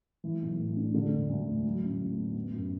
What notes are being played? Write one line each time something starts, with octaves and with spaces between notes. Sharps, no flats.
E3
B1
A2
D4
D3
E1
D2
E1
F#3
A1
A2
B3
B3
F#2